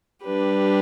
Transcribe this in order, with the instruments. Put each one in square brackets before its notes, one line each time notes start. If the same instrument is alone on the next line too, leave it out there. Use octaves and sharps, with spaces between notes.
[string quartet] G3 D4 G4 B4